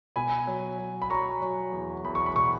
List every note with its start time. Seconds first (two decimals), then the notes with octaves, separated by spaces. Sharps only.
0.16 B2 G#5 B5
0.47 F#3
0.78 F#3
1.02 B5
1.10 F#3 A#5 C#6
1.41 F#3
1.72 E2
2.04 E2 B5
2.15 C#6
2.26 B5
2.35 B2 C#6